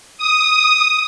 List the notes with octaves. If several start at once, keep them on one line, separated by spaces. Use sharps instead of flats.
D#6